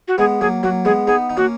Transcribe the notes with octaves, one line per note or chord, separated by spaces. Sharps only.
F#4
G#3 B3 G#4
F#3 A#3 G#4
F#3 A#3 F#4
G#3 B3 G#4
B3 D#4 G#4
D#4
A#3 C#4 F#4